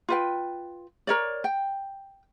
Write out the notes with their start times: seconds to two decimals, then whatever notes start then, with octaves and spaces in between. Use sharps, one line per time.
0.09 F4 B4 G5
1.07 A#4 C#5 D5
1.44 G5